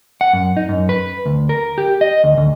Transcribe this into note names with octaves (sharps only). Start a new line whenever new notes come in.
F#5
F#2
D#4
F#2
B4
D2
A#4
G4
D#5
D2
D2